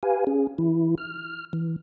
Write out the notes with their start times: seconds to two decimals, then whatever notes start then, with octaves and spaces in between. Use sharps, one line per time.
0.03 G4 B4 F5 G#5
0.27 C#4 G#4
0.58 E3 E4
0.98 F6
1.53 E3